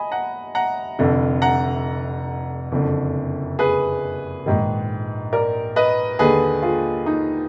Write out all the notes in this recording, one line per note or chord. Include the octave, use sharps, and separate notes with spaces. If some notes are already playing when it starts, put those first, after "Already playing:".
Already playing: D#5 G#5 B5
F#5 A#5
F#5 A#5
F1 F2 D3
F#5 A#5
F#1 F2 D3
G#4 B4
A#1 G#2 D#3
A#4 D5
B4 D#5
D#2 D3 G#4 B4
F4 G#4
D#4